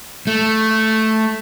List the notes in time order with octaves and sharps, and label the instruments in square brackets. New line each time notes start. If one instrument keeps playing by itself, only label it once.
[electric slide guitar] A3